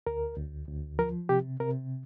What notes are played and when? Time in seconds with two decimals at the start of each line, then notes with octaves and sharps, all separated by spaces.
0.07 D2 A#4
0.37 D2
0.68 D2
0.99 F3 A#4
1.29 C3 G4
1.60 C3 A#4